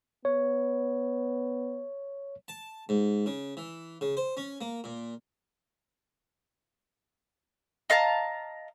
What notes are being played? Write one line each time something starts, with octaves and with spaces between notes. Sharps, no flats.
B3 C#5
A5
G#2
C#3
E3
C#3
C5
C#4
A#3
A#2
D#5 F5 A5 A#5